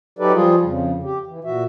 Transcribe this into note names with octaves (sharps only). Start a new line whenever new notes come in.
F#3 D#4 G4 A4 B4 D5
F3 G3 F4 G#4
F2 C#3
G4
E3
A#2 F#4 E5